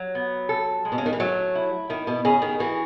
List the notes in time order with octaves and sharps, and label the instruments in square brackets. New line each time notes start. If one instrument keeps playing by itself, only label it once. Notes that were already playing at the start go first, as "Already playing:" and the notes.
Already playing: [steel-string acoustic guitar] F#3
[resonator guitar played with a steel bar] B3
A4
G#3
[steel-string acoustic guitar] B2
C#3
D#3
E3
[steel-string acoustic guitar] F#3 [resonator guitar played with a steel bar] A3
[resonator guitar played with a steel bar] E4
[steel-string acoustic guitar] D#3 [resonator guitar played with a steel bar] E4
[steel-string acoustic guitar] B2
[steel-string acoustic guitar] C#3 [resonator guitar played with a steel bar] G#4
[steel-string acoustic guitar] D#3
[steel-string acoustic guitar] E3 [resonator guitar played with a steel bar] F#4